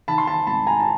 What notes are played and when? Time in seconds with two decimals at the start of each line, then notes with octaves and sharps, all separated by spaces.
0.08 D#3 A5 B5
0.18 C6
0.27 A5 B5
0.47 G#1 A5 B5
0.67 G#5 A#5
0.80 A5